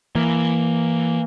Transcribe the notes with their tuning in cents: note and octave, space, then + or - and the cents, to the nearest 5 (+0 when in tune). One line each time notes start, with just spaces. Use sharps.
E3 +10 A#3 +0